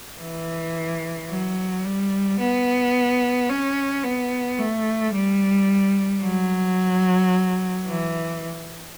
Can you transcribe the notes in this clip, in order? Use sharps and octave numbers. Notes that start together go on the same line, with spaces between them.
E3
F#3
G3
B3
C#4
B3
A3
G3
F#3
E3